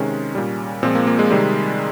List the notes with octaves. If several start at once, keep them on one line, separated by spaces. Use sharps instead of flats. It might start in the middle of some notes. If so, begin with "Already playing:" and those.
Already playing: C3 D#3 G#3 C#4
A#2 G3
A#2 F3 G#3 C4
A#3
A#3
G#3
C3 D#3 G3